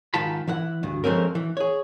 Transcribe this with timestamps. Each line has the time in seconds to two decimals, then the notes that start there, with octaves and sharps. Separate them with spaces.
0.14 G#2 D#3 F4 A5 B5
0.47 E3 E4 F#5
0.83 D2 G2
1.04 F3 G#3 A3 C4 C#4 A#4
1.35 E3
1.57 G#4 C#5